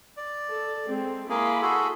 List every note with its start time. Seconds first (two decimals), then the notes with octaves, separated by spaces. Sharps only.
0.17 D5
0.52 A4
0.86 G#3 C4 A4
1.29 A#3 E4 G#4 B5 C6
1.62 F#4 G#4 A4